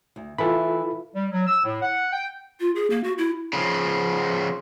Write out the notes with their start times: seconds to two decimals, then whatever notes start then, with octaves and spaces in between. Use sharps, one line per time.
0.16 D2
0.38 E3 F4 A4 B5
1.15 G3
1.31 F#3
1.47 E6
1.64 A2
1.82 F#5
2.13 G5
2.60 F4
2.75 G#4
2.90 A#3
3.04 F#4
3.18 E4
3.53 C#3 F3